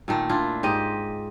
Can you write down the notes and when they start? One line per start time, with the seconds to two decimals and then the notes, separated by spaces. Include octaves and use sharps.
0.08 A#2 D#3 A3
0.29 D4 E4 F4
0.63 G#2 G4 D#5